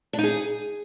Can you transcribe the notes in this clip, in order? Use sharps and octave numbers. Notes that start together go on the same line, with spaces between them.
D4
D#4
G#4